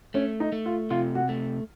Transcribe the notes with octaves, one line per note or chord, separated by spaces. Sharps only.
A3 C#4
D#4
A3
F4
C3 F4
F#4
A3